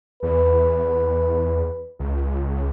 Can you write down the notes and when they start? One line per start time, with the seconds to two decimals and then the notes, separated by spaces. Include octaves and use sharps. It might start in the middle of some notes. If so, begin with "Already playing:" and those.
0.23 E2 B4
1.99 C#2